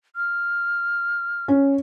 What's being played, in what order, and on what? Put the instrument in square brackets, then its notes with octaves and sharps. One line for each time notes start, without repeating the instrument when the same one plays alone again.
[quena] F6
[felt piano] C#4